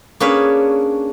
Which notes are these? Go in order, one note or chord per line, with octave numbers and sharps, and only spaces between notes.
A#3 C#4 D4 G#4 B4 C#5